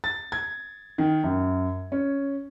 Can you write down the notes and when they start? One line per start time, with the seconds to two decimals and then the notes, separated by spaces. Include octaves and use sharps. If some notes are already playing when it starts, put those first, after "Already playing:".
0.04 A6
0.32 G#6
0.98 D#3
1.24 F#2
1.92 C#4